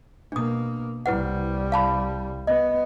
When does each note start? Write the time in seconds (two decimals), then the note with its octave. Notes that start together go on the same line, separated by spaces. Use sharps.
0.32 B2 A#3 D4 D#6
1.06 C2 G3 E4 B4 F#5
1.72 F5 A5 B5
2.47 B3 D#5